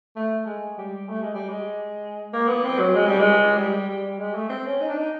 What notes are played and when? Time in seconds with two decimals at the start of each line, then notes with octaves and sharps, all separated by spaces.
0.16 A3
0.46 G#3
0.78 G3
1.09 A3
1.22 G#3
1.35 G3
1.49 G#3
2.33 A#3
2.49 B3
2.64 C4
2.79 F#3
2.95 G#3
3.07 G3
3.19 G#3
3.57 G3
3.88 G3
4.19 G#3
4.35 A3
4.50 C4
4.66 C#4
4.81 D#4
4.89 D4
4.97 D#4